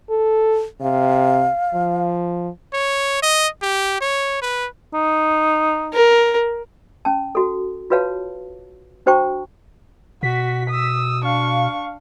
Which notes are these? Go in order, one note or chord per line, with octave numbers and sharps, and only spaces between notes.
A4
C3 F5
F3
C#5
D#5
G4
C#5
B4
D#4
A#4
C#4 A5
F#4 A4
F4 F#4 B4 C#5 F5 A5
D4 F#4 C5 G5 A5 C#6
B2 F#4 B6
D#6 E6
D4 F5 C#6